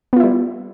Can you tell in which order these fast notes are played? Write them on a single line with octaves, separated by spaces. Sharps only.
B3 F4 E4 G3